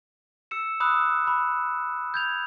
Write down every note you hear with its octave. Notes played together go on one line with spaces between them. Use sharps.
E6 C#7 E7
B5 D#6 E6 F#6
B5
G6 G#6 F7